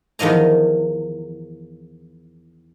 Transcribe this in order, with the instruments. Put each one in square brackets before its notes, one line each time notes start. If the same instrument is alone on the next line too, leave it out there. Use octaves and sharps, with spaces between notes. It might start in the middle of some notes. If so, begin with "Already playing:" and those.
[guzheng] E2 D#3 F3 D#5 A#5